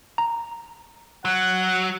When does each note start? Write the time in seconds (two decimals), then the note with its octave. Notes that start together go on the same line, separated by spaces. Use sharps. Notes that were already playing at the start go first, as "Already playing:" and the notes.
0.18 A#5
1.25 F#3 F#5